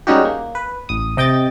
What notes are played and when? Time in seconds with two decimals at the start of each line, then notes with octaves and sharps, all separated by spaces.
0.07 G3 G#3 C#4 D#4 F#4 G4
0.25 A#3
0.55 B4
0.89 A1 D#6
1.17 C3 D#5 G5 G6 A6